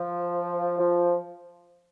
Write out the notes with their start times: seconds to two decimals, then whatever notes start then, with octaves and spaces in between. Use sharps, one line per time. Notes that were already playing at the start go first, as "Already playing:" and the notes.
Already playing: F3
0.79 F3